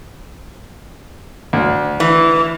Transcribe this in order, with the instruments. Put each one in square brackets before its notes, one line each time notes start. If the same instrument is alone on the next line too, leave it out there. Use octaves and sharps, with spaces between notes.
[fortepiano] D2
[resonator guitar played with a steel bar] E3